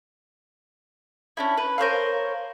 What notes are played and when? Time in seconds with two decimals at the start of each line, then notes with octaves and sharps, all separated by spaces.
1.37 C#4 D4 E4
1.57 B4
1.78 A#4 C5 C#5 F5